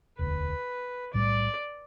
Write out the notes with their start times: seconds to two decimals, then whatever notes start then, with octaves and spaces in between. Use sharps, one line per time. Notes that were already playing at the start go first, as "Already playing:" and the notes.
0.19 E1 D2 D3 B4
1.14 B1 A2 G3 D5